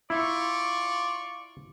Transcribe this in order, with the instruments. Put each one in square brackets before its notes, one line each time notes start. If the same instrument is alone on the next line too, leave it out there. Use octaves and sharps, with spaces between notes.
[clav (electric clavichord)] E4 [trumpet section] F4 D5 C#6